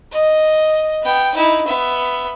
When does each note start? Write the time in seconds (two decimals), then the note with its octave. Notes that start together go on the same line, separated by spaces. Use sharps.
0.12 D#5
1.03 B3 G5
1.35 D#4 E4
1.67 B3 E5